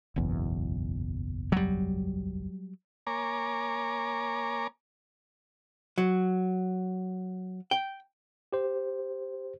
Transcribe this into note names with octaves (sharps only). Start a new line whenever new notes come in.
F#1 B1 E2
F#3 G3
A#3 C#5 G#5 A#5 D6
F#3
G5
G4 C5